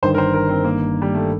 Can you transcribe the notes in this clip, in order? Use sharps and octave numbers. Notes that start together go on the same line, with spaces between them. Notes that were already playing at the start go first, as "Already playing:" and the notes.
G1 G2 D#3 C5
A#4
C5
A#4
C4
A#3
G3
A3